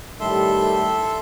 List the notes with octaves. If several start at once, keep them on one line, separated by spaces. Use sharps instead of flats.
A2 D#3 G3 A4 E5 C6